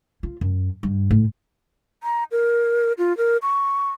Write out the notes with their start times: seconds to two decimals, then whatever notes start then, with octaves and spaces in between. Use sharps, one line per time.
0.23 F4
0.41 F#2
0.83 G2
1.11 A2
2.03 A#5
2.32 A#4
2.98 F4
3.17 A#4
3.42 C#6